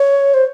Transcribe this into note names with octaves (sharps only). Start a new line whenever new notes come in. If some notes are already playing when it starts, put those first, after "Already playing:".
Already playing: C#5
C5